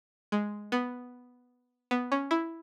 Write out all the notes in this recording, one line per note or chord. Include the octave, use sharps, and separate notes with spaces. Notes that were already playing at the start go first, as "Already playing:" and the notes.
G#3
B3
B3
C#4
E4